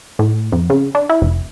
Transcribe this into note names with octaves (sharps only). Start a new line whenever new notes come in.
A2
F2
C#3
D4
E4
F1